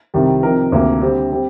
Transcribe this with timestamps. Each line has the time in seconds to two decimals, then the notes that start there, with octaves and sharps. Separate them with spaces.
0.14 C2 C3 D#3 G3
0.43 C3 F3 C4 D#4 A#4
0.72 D2 C3 D#3 A#3
1.01 D3 G3 C4
1.32 G3 C4